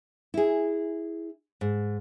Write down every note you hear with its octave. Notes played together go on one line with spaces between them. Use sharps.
E4 G#4
G#2